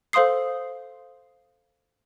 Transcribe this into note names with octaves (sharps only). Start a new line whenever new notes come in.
A4 C5 F5 C6 D#6 C7